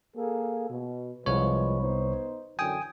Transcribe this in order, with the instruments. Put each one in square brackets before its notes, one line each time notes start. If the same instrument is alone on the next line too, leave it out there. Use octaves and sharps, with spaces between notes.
[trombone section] A#3 G#4 A4
B2
[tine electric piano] C2 C#5 [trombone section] F3 G#3 B4
[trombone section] B3 D#4 C5
[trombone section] F#2 D3 E3 [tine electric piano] G5 G#5 D#6